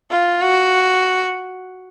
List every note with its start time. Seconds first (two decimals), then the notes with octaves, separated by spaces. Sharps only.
0.11 F4
0.42 F#4